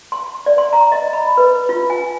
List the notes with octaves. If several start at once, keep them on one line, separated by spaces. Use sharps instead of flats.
C6
D5
C6
A#5
D#5
B5
B4
F4
G#5